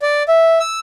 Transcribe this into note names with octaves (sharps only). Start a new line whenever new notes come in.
D5
E5
E6